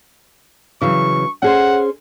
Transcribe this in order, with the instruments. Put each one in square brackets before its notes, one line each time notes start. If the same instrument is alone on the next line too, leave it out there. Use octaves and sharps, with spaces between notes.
[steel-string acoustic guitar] C#3 E3 F#3 [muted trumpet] C#6
[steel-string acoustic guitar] C#4 G#4 C5 [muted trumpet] F#5